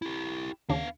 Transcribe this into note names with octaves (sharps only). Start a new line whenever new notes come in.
E4 G4
D#2 C#3 B3 D4 F5